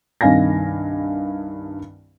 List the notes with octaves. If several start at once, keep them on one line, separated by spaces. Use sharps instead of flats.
C2 G2 D#3 F5 G#5 A#6